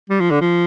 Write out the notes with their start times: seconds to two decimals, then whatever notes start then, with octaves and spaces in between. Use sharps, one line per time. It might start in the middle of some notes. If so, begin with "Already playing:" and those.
0.10 G3
0.20 F3
0.31 D3
0.41 F3